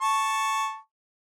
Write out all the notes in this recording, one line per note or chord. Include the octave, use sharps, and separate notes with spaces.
A5 C#6